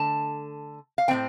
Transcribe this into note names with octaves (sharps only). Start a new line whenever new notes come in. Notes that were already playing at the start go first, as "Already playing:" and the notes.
Already playing: D3 A3 A5
F5
A2 A3 C4 G5